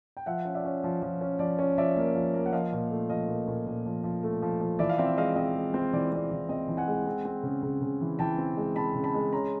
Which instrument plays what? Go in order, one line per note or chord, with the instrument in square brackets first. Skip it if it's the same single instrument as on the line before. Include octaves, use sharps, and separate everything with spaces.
[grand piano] G5
F3 E5 F#5
C#4
D5 E5
C#4
F3
F3
C#4
F3 D5
C#4
F3 D5 E5
A#3
F3
A#3
F#5
F3 D#5 F5
A#2
A3
F3 D#5 F5
A#2
A#2
A#2
F3
F3
A3
F3
F3
E3 D5 E5
F5
C4 D5 E5
G#3 D#5 F5
C4 D#5
G#3
C4
E3 D5
C4 D5
E3
C4 D#5
E3
F#5 G#5
G#3
C4
C4
C#3
C#3
C#3
E3
E3 G5 A5
C4
G#3
C4 A5 B5
C#3
A5 B5
G#3
C#4 A#5 C6